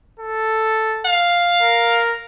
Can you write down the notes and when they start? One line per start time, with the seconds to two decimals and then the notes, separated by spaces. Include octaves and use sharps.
0.20 A4
1.06 F5
1.62 A#4